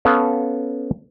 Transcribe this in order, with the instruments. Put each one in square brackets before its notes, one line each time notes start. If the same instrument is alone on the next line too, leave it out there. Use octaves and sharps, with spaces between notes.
[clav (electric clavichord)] B3 C#4 A4 F5